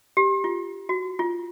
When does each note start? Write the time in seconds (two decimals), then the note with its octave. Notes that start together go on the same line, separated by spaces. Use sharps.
0.17 G4
0.44 F4
0.89 F#4
1.19 F4